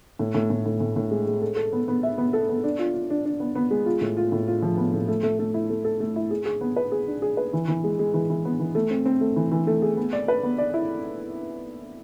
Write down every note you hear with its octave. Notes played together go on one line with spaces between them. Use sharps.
A2
A2
A2
A2
A2
A2
G#3
G#3
A4
A4
B3
B3
E5
B3
A4
B3
D4
F4
F4
D4
D4
B3
B3
G#3
F4
A2
F4
A2
F4
F3
B3
A2
A3
A3
A3
E4
A3
A4
A3
E4
G#4
G#4
B3
B4
G#4
D4
G#4
B4
E3
E3
G#3
G#3
E3
E3
B3
E3
A3
C4
C4
A3
E3
E3
A3
G#4
B3
D5
B4
B3
D5
E4